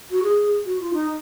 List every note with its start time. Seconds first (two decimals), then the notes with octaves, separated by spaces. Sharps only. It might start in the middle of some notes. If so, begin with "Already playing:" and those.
0.11 F#4
0.23 G#4
0.66 F#4
0.80 F4
0.93 D#4